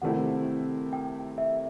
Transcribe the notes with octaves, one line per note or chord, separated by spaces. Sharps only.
C3 D#3 A3 C4 E4 F#5
G5
E5